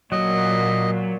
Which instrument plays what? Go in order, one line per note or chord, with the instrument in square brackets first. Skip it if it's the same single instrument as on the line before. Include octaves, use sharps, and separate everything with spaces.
[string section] A#2 [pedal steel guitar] F#3 [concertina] D#5